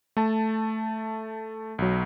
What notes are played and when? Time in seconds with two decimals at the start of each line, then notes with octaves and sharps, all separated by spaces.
0.17 A3 A5
1.78 B1 F#3